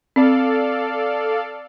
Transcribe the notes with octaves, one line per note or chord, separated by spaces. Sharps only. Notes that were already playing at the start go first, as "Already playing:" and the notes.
C4 A4 D5 F5